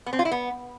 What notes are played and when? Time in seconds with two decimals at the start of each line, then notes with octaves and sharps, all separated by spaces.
0.06 B3
0.13 C4
0.19 F4
0.25 E4
0.31 B3